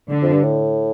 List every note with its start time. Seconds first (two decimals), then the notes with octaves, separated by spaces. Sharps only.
0.10 D3
0.22 F2
0.33 G2
0.44 A2